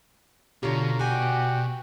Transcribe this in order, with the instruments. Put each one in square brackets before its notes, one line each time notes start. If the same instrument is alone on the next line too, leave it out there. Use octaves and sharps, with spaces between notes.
[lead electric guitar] B2 [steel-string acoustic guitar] D3 G4 [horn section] F4 C#5 A#5
[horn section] F#4 D5 G5 [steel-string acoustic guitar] G4 G#5